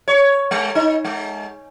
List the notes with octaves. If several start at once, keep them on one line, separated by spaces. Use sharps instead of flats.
C#5
G#3
D#4
G#3